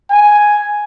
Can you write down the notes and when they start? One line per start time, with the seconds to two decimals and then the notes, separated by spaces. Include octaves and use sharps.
0.11 G#5